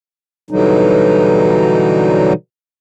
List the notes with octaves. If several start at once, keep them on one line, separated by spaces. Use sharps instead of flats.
B2 D3 E3 F#3 G3 D#4